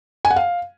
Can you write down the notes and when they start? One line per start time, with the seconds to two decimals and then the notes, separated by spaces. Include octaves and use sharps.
0.25 G#5
0.30 F#5
0.36 F5